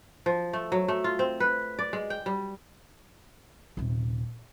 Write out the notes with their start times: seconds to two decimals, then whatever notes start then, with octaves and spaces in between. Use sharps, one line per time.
0.26 F3
0.53 A3
0.72 F#3
0.88 A3
1.04 F4
1.19 C4
1.40 B4
1.79 D5
1.93 G#3
2.10 G5
2.26 G3
3.77 D#1 C3